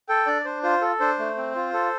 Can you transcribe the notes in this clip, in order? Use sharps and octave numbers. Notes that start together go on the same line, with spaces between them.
A4 G5
D4 D5
D4 C5
F4 C5
A4
D4 C5
A3
C4
F4
A4